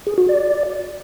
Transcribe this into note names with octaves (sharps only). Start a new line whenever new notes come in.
G#4
F#4
D5